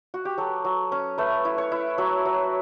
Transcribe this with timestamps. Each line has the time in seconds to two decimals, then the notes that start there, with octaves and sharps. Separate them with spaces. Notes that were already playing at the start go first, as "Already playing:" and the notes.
0.14 F#4
0.25 G4
0.38 F#3 A4
0.65 F#3
0.92 C#4
1.18 A3 B4
1.45 E4
1.58 C#5
1.72 E4
1.98 F#3 E5
2.26 F#3